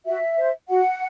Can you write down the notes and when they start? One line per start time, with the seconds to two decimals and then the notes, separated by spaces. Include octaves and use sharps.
0.07 F#4 E5
0.37 C5
0.69 F#4 F#5